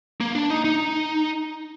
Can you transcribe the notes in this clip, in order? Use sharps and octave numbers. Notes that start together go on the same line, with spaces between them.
A#3
D4
D#4
D#4